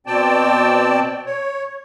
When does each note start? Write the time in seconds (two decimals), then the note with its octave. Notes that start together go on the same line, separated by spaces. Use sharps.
0.07 B2 C4 D5 G5 A5
1.26 C#5